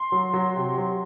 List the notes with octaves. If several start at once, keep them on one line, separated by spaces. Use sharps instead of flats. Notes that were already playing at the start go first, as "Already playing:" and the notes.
Already playing: C6
F#3
F#3
C3
F#3